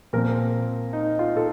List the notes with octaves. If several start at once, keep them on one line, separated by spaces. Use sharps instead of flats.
A#2 F3 C4 A#4
D#4
F4
A4